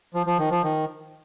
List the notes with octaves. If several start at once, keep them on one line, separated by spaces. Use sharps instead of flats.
F3
F3
D#3
F3
D#3